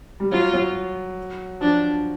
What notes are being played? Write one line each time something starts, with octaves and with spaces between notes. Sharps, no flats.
G3
F#3 F4
F#3
F3 D4